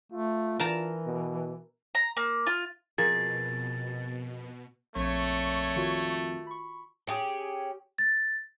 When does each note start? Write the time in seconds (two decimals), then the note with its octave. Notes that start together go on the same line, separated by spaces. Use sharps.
0.12 A3 F4
0.60 E3 A#4 A5 A#5
1.06 B2
1.95 A#5
2.17 A#3
2.47 F4
2.98 F2 B2 G#4 A#4 A6
4.96 A#1 F2 A#2 A3 C#5
5.76 D#3 F4 F#4
6.47 B5 C#6
7.07 C#4 G4 G#4
7.98 A6